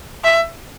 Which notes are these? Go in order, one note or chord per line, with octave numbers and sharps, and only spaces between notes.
E5